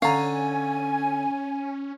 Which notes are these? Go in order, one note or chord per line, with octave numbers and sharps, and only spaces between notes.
D3 C#4 C#5 F5 G#5 A#5